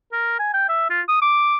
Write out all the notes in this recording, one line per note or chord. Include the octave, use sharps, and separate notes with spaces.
A#4
G#5
G5
E5
F4
D#6
D6